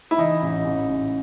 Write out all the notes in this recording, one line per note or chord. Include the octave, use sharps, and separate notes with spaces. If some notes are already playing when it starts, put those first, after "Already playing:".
E4
E3 D#4
A1
A1
A1